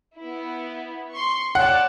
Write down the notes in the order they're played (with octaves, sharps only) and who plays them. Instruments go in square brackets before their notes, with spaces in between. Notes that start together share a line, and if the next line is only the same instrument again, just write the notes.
[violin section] B3 E4
C6 C#6
[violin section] C#5 D5 A5 [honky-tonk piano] F#5